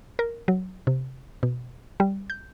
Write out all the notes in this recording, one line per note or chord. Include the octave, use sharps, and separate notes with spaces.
A#4
F#3
C3
B2
G3
G6